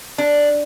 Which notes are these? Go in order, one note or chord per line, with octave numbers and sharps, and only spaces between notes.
D4